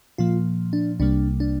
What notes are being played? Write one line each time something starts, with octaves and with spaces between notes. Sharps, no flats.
A#2 F3 A#3 F4
D4
C2 C3 G3 A#3 D4
D4